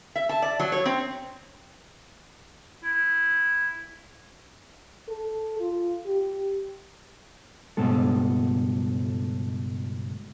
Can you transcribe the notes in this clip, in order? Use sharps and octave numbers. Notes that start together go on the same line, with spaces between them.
E5
A5
D5
F#3
C#5
C4
E4
A4
F4
G4
C#2 G2 B2 G#3 A4